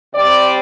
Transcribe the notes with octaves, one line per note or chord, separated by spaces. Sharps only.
C3 G3 C4 D5